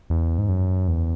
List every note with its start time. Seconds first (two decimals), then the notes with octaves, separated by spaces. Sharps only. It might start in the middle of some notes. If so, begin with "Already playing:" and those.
0.10 E2
0.38 G#2
0.49 F#2
0.88 E2